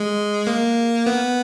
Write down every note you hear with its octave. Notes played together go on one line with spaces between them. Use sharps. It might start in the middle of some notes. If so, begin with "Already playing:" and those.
Already playing: G#3
A#3
B3